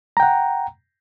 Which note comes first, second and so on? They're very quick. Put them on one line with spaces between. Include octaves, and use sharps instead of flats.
A#5 G5 F#5